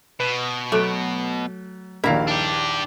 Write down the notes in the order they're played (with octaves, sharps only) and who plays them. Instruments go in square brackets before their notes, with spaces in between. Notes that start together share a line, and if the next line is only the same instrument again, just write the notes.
[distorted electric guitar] B2 [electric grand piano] B4
[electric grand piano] F#3 F#6 D7 [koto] A3 [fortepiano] D6
[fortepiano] A#1 D#2 [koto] E4 A#5 [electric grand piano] A#4 D5 F5
[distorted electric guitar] D4 G4